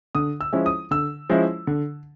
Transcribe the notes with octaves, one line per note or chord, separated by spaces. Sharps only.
D3 D#6
E6
F3 G#3 C#4 E4
D#6
D3 E6
F3 G#3 C#4 E4
D3